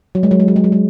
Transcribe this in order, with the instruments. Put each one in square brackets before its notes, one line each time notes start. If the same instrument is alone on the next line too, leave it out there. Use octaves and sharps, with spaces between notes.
[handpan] F#3
G#3
F#3
G#3
F#3
G#3
F#3
G#3